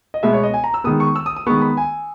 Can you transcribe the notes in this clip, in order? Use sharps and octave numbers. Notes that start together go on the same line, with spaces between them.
D#5
B2 G#3 B3 E5
C#5
D#5
G#5
A#5
E6
D#3 G#3 B3 D#6
C#6
E6
D#6
D#6
D#3 G#3 B3 C#6
B5
G#5